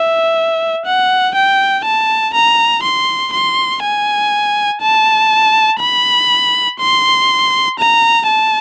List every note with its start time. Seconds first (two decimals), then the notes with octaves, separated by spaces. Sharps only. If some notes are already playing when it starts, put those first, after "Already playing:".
Already playing: E5
0.86 F#5
1.35 G5
1.85 A5
2.34 A#5
2.83 C6
3.33 C6
3.82 G#5
4.81 A5
5.80 B5
6.80 C6
7.79 A#5
8.28 A5